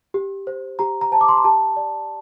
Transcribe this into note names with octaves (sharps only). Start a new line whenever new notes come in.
G4
C5
G4 A#5
A#5
C5 A5
D6
C6
A#5
G4 A5
D5